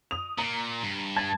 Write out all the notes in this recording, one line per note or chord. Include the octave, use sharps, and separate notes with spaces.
D#6 F7
A#2 A#5
G2
A5 G#6 A6